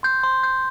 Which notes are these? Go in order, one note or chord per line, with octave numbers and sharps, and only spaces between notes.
C6 G6
C6
G6